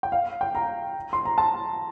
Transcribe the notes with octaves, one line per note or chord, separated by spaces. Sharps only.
G5
F5
G5
A#5
C6
A#5
A5